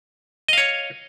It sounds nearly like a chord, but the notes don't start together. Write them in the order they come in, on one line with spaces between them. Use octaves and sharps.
D#5 F5 C#5